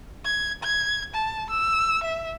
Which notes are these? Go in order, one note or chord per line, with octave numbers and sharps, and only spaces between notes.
G#6
G#6
A5
E6
E5